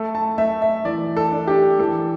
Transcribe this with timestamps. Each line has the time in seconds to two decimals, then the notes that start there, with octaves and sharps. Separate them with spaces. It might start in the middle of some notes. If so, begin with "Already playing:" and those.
Already playing: A3 A4
0.15 A5
0.38 A3 E5
0.62 E5
0.85 E3 D5
1.17 A4
1.32 D4
1.47 G4
1.79 E3 A4